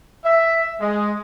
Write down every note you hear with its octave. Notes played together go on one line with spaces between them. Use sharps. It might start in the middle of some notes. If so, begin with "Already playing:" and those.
E5
G#3